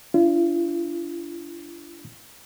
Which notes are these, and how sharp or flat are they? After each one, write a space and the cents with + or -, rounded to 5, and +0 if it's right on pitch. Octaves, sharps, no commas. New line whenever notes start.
D4 -10 F4 -45